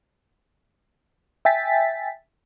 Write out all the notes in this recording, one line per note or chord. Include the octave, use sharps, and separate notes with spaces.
E5 G5 G#5 A6 B6